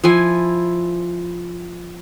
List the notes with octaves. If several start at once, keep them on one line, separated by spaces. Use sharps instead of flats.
F3 E4 G#5